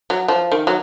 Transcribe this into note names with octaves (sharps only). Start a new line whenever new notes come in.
F#3
F3
D#3
F#3